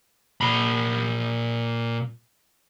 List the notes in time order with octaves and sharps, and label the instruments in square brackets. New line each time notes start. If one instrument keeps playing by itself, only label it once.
[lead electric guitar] A#2 B5